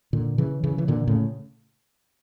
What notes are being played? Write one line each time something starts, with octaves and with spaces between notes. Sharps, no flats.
A#2 D3
C#3 E3
C#3 E3
E3
A#2 D3
A2 C#3